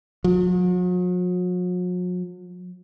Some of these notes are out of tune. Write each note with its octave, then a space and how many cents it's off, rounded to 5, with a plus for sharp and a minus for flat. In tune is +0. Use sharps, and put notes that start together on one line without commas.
F#3 -45